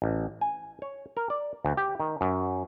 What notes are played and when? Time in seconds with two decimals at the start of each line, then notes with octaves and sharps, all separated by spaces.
0.02 A1
0.41 G#5
0.82 C#5
1.17 A#4
1.30 D5
1.65 D2
1.77 G4
2.00 D#3
2.21 F#2